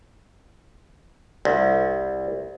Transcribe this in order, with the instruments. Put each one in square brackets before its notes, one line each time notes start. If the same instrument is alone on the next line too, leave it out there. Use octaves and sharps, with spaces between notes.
[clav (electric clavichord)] C2